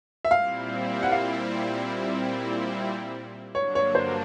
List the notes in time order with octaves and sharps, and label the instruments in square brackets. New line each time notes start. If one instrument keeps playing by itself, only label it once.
[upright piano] E5
[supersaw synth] A#2 G3 C4 E4 [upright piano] F5
[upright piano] F#5
F5
[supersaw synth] G2 D3 F#3 A#3 D4 [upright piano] C#5
[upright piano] C#5
C5